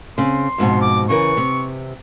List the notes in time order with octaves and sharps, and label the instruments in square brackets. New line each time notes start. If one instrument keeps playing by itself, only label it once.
[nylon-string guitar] C#3 C4 [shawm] C6
[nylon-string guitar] F2 G#2 B2
[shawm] D6
[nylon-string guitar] C#3 E3 A#4 [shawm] C#6
[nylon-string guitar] C3 C4